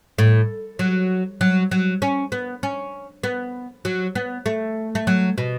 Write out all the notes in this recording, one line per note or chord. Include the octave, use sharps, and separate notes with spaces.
A2
F#3
F#3
F#3
C#4
B3
C#4
B3
F#3
B3
A3
A3
F#3
B2